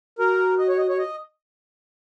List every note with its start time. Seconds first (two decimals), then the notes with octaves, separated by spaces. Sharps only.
0.19 F#4 A#4
0.58 D#5
0.69 C#5
0.78 D#5
0.89 C#5
0.98 D#5